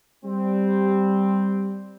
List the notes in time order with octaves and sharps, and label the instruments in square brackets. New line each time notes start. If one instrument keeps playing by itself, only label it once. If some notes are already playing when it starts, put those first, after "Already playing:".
[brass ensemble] G3 C4